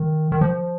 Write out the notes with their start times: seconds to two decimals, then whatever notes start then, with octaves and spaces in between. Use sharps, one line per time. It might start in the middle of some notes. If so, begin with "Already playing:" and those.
Already playing: D#3
0.32 D#3
0.41 F3